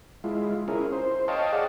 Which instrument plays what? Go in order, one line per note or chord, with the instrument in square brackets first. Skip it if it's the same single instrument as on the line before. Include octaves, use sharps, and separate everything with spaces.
[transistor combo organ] G#3 E4 F4
C#4 E4 G#4 A#4
C5
C#5 D#5 F5 G5 A5
G#4 D5 D#5 F#5 A5